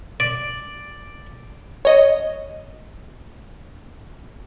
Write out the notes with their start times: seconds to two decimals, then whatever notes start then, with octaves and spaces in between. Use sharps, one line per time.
0.20 D5
1.85 C#5 D#5